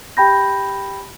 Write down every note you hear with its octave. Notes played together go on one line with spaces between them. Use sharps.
G4 G5 A5 B5 G6 A#6